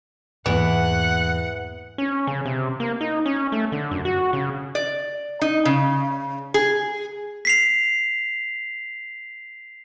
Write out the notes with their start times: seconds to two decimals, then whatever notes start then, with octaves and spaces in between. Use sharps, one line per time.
0.46 E2 G#2 E3 A#3 F#5
1.98 C#4
2.27 C#3
2.46 C3
2.80 A#3
3.01 D#4
3.26 C#4
3.52 A3
3.72 D3
3.91 F#2
4.05 F#4
4.33 C#3
4.75 D5
5.41 D#4
5.65 C#3
6.54 G#4
7.45 B6 C7 F7